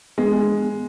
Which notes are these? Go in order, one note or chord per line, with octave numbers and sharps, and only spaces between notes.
G#3 B3
G#3